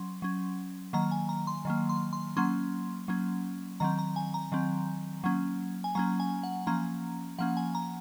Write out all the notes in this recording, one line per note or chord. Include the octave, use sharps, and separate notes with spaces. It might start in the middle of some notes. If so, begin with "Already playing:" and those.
Already playing: F#3 C#4 C6
F#3 C#4
D#3 F#3 A#3 A#5
G#5
A#5
C6
D#3 F#3 A#3
C6
C6
F#3 A#3 C#4 C6
F#3 A#3 C#4
D#3 F#3 C4 A#5
A#5
G#5
A#5
D#3 F#3 C4
F#3 A#3 C#4
G#5
F#3 A#3 C#4 A#5
G#5
F#5
F3 A#3 C#4 A#5
F3 A#3 C#4 F#5
G#5
A#5